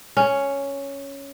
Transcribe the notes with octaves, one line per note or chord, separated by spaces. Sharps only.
C#4